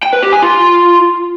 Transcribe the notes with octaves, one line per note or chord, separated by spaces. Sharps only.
G5
B4
G4
G#5
F4